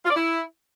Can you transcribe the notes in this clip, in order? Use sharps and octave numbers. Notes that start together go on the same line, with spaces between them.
F4
D5
E4